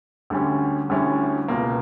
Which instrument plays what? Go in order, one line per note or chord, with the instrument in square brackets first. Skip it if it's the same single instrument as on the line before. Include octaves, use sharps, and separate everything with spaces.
[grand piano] D2 D3 G3 C#4
D2 D3 G3 C#4 E4
C#2 B2 A#3